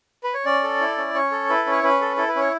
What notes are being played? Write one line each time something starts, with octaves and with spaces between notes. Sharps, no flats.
B4
C#5
C#4 D5
A4
E4
C#4
C#4 C#5
A4
E4 B4
C#4
C#5
C#4 B4
A4
E4 A4
B4
C#4 C#5